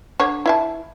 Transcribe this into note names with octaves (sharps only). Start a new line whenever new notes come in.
D3 C#5
E4 E5 A5